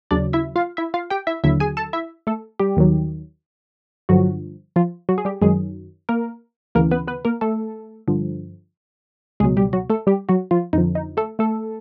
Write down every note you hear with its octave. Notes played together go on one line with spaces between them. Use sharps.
D#2 C#3 F#3 D4 D5
E4 E5
F4 F5
E4 E5
F4 F5
G4 G5
E4 E5
D#2 D3 F#3 E4 E5
G#4 G#5
A4 A5
E4 E5
A3 A4
G3 G4
D#2 D#3 F#3
G2 D3 F3 F#3 F#4
F3 F4
F#3 F#4
G#4
G3 G4
F#2 D#3 F#3 G#3 G#4
A#3 A#4
D2 C#3 E3 A#3 A#4
B3 B4
B3 B4
A#3 A#4
A3 A4
G2 D3 F3
C#2 B2 F#3 G#3 G#4
G3 G4
F#3 F#4
A3 A4
G3 G4
F#3 F#4
F3 F4
F2 D3 F3 D#4
D#4
A3 A4
A3 A4